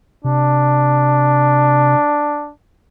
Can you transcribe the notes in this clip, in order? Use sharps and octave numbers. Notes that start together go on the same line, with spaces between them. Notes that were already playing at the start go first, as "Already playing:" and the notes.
C3 D4